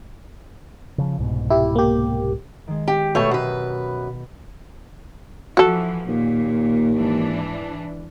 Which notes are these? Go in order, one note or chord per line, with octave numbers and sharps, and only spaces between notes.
C#3 F3
C2 G#2 B2
E4 G4
A#3 G4
D#3 G#3
G4
B2 A3 C#5 A5 G6
F#2 B4
E3 F3 F#4 A4
D#2 A#2
G#2 E3 D4